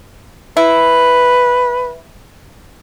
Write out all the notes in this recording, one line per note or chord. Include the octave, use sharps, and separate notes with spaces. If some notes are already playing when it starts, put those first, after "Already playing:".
E4 B4